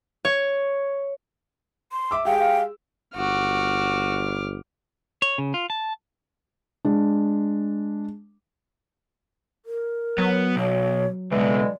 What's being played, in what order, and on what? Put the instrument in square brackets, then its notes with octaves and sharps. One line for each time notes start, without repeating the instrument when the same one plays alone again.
[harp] C#5
[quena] C6
[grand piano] E5 D6 E6
[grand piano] G#3 G4 G#4 [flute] F5 [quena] G5
[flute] F5
[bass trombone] G1 [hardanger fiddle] F#4 [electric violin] D6 F6
[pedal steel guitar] C#5
C#3
F4
A5
[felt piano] G#3 D4
[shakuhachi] A#4
[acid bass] F#3 [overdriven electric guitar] B3
[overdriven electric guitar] B1 [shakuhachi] C#5
[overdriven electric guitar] C#2 B2 [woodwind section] D3 E3 G#3 [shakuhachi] D5